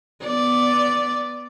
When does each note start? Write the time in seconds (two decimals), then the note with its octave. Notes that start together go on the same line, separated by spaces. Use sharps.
0.24 B3 D5